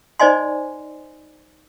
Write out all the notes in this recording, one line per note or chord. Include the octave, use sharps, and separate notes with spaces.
D#4 C5 D5 D#5 G#5 C6